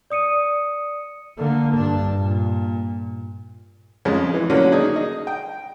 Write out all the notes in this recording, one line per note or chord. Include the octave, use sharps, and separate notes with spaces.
D5 D#6 C#7 D#7
D3 A#3
G2 D4
A#2
F2 C#3 G#3
E3
D3 F#3 A#3 C#4 D4
D4 D#4 G#4
D#5
G5